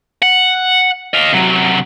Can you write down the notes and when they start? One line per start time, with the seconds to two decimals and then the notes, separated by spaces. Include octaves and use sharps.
0.22 F#5
1.13 D#5 F5
1.33 C3 F#3